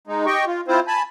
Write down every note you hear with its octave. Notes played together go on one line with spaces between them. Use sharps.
G#3 D#4
G4 D#5 G5 C#6
F4
C4 E4 F4 C5
G#5 A5 B5